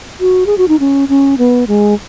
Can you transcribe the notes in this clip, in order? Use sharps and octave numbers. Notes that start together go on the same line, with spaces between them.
F#4
G#4
F#4
D#4
C#4
C#4
B3
G#3